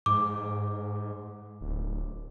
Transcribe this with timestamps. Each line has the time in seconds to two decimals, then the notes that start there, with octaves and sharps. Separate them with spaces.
0.06 G#2 D6
1.61 D1